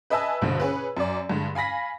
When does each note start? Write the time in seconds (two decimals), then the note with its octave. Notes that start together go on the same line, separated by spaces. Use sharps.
0.10 B4 D#5 E5 G#5 A5 E6
0.41 A#1 G2 B2 D3
0.60 C#4 G#4 B4
0.97 F#2 D5
1.30 G2 D3 G#3
1.55 F5 G#5 B5 A#6 B6